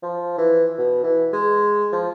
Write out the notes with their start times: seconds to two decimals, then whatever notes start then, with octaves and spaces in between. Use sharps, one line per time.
0.03 F3
0.38 E3
0.78 B2
1.04 E3
1.33 G#3
1.92 F3